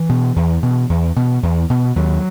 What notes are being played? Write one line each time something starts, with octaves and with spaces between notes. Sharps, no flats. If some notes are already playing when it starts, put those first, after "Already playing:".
Already playing: E3
B2
E2
B2
E2
B2
E2
B2
D#2 F#3